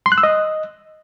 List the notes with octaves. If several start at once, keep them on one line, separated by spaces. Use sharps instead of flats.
C6
F#6
E6
D#5